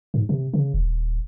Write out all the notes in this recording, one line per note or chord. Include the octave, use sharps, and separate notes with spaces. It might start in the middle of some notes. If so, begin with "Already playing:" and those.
G#2
C3
C#3
D#1